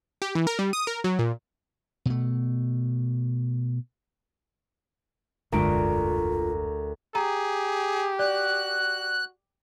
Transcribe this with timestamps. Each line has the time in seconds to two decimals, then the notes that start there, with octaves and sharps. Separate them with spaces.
0.22 G4
0.35 E3
0.47 A#4
0.59 G3
0.73 D#6
0.87 A#4
1.04 F#3
1.19 A#2
2.06 B2 A3
5.52 F1 D2 G2 G#3 F4 A#4 D7
7.15 G4 G#4 A#5
8.19 F#4 D5 F#6